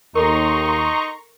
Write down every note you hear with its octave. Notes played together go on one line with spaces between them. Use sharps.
D#2 D#4 A4 A#4 A#5 C6 C#6